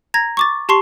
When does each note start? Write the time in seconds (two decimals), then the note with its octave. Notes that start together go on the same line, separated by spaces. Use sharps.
0.14 A#5 G#6 A#6
0.37 C#6 D6 A6
0.69 G4 A5 C6 C#6 C7